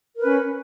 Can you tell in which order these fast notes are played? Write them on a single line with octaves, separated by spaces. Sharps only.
A#4 B4 C#4